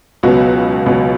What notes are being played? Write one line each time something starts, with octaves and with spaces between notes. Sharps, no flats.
C#2 B2 F#3 B3 F#4
C#2 B2 F#3 B3